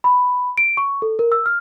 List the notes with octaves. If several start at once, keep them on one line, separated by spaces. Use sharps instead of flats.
B5
D7
C#6
A4
A#4
E6
F6